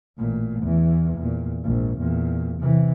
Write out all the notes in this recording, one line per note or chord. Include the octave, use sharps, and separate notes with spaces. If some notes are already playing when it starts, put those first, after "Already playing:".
A1 A#2
E2 E3
E2 A#2
A#1 G#2
E2 A#2
C3 E3